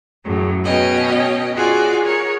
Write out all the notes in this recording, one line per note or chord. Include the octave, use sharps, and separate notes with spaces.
F#2 A2 C#3
B2 B3 C#4 D#5 G5
F4 F#4 G#4 D5 G#5
G#4 A#4 C#5